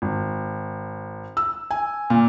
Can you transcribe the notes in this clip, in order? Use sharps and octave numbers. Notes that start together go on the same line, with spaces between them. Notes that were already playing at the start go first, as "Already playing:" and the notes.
G#1
E6
G#5
A#2